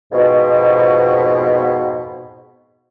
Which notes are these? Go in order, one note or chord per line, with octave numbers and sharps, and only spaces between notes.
F2 G#2 B2